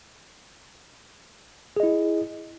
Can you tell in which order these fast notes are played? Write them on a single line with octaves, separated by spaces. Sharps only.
G#4 D#5 E4